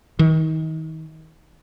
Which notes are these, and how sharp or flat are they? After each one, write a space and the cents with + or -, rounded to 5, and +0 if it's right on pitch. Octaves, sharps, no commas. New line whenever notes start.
D#3 +35